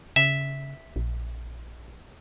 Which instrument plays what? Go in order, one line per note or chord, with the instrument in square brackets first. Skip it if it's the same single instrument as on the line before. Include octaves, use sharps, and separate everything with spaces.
[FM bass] C#3 [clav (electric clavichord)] E5
[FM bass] A#1